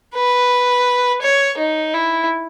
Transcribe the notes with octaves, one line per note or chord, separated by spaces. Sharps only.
B4
C#5
D#4
E4